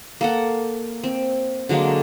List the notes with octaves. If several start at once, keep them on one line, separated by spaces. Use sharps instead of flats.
A#3 A4 F#5
C4
D3 F#3 G#3 A#3